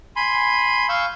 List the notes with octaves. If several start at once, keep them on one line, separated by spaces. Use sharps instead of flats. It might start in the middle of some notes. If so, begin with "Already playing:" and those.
G#5 B5 C6
F5 C#6 E6 G6